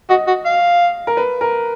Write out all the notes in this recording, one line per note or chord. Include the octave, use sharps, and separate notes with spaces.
F#4 D#5
F#4
F5
A#4
B4
A#4